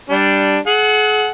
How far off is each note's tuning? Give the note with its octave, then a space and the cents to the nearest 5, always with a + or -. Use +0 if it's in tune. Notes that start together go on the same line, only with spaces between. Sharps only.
G3 +0 D4 +0
G#4 +45 F#5 +0